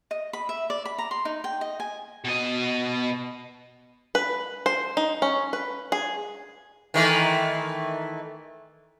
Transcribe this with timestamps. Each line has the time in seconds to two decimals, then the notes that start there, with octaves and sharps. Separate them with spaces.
0.11 D#5
0.33 B5
0.49 E5
0.70 D5
0.85 B5
0.99 A#5
1.11 C6
1.25 D#4
1.44 G5
1.61 D#5
1.80 G#5
2.24 B2 D#5
4.15 B4
4.66 C5
4.97 D#4
5.22 C#4
5.53 B4
5.92 G#4
6.94 D#3 E3 A3